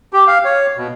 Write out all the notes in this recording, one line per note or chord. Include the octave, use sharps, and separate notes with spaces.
G4
F5
C#5
B2